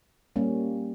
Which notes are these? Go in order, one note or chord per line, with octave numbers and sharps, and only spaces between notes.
G3 A#3 C#4